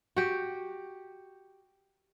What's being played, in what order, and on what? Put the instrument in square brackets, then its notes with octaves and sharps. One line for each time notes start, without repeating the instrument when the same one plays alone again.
[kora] F#4 G4